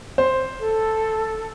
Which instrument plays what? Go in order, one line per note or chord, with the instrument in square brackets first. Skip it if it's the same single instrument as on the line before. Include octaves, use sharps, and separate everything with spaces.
[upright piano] C5
[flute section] A4